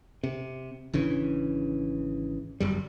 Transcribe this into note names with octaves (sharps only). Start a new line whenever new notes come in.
C3
G#1 C#3 E3 D4
G1 F#2 G3